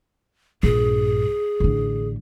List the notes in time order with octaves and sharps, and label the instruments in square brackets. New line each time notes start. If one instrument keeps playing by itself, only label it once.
[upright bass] A#1 G2 [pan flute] G#4
[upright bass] A1 D3